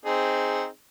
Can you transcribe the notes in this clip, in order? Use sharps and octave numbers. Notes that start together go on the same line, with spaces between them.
C4 D#4 G#4